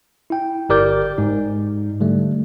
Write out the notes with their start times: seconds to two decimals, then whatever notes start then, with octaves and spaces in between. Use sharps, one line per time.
0.30 E4 G5
0.69 G1 G4 A#4 D5 D6 G6
1.18 G#2 D#4
2.00 D3 G3 A3